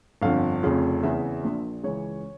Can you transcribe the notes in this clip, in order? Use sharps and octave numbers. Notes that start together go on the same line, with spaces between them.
G1 F2 D3 F3 F5
F1 F2 C#3 F3
E2 C#3 E3 E5
A#1 A#2 F3
C#2 C#3 E3 C#5